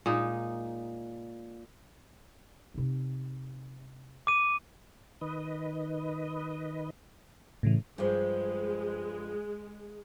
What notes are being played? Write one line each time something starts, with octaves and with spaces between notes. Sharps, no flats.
A#2 G#3 D#4
C3 D#4
D6 D#7
D#3 B4 D#5
A2 C#3 E3
G2 F3 G#3